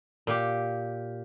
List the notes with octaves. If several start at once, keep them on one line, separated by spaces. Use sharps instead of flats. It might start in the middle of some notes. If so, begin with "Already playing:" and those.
A#2 G4